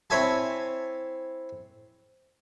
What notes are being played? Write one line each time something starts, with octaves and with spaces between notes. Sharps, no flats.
C4 E4 C#5 E5 G#5 A5